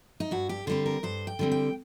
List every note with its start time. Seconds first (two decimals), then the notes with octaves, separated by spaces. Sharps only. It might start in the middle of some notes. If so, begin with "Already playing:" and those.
0.20 D#4
0.31 G2 F#4
0.49 G4
0.67 D3 G3 C4 C5
0.86 A#4
1.03 G2 C5
1.27 G5
1.39 D3 G3 C4
1.51 G5